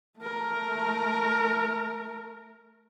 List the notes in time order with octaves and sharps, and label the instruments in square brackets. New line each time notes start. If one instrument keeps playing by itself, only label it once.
[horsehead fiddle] A3 A#4